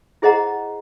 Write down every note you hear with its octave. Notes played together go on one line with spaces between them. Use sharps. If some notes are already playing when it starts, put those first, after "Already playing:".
E4 G#4 C5 D#5 F#5 A#5